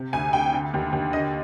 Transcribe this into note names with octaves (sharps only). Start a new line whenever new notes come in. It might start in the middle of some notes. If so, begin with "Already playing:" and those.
Already playing: C3
D2 G#5
D2 G5
D3
D#2
D#2
D3 D#5